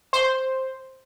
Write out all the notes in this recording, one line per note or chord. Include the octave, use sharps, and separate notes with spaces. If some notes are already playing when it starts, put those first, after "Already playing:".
C5